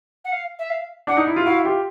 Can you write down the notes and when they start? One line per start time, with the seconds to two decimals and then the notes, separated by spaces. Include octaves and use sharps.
0.25 F#5
0.32 F5
0.59 E5
0.70 F5
1.07 D4 F#5
1.17 D#4
1.27 E4
1.36 F4
1.46 E4 F#4 F5
1.65 F4 G4